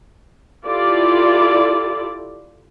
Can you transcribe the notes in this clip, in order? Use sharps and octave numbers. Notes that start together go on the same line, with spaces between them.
E4 F4 G4 A4 D5